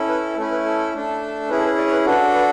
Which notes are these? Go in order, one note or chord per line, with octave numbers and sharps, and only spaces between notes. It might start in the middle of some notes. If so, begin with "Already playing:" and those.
Already playing: C#4 E4 A4
B4
A3 C#4 E4 A4
B4
A4
A3 D4 A4
C#4 E4 G#4 B4
A4
B4
D5
C#5
B4
D4 F#4 A4 B4
B4